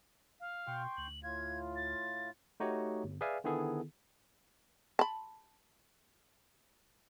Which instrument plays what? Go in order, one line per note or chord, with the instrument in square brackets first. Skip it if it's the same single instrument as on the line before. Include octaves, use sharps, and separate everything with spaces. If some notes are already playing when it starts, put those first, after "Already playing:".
[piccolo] F5
[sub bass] B2 [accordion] G5 C6 C#6
[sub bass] D2 [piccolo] F#7
[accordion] A2 F4 [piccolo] G#6
[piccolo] A6
[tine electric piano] A3 D#4 F#4 G4 C#5
G1
G#4 B4 D5 E5 F5 G#5
D3 D#3 B3 E4 G#4 A4
[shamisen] A5 B5